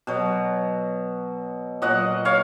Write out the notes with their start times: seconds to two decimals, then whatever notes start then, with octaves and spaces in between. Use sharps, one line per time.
0.07 B2 F#3
1.82 A#2 F#3 D#5 F#5
2.25 C#5 F5